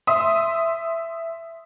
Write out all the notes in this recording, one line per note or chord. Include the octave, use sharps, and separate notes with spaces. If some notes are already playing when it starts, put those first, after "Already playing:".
E5 C6 D#6